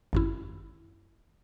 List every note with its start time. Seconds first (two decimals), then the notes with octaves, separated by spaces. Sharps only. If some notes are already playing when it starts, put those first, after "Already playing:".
0.13 G#1 F#2 E4